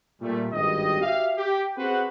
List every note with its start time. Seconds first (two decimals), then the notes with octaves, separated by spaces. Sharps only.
0.21 A#2 G3 A3
0.52 G#1 G2 G4 D#5
1.01 F#4 G4 E5 F5
1.38 G4
1.78 C4 F#4 G#4 B4 C5 F#5